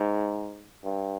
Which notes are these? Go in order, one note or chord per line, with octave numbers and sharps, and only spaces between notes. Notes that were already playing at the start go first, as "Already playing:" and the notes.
Already playing: G#2
G2